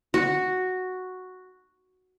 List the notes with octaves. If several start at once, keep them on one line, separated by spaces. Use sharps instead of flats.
F#4